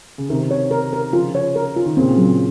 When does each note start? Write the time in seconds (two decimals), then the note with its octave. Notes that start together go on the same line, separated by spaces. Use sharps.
0.18 C#3
0.29 C3 D#3 A#4
0.51 C#5
0.71 A#4
0.93 A#4
1.13 C#3 F3 F4
1.35 C#5
1.56 A#4
1.76 F4
1.85 D#3
1.97 A#2 C#3 C4
2.18 F#3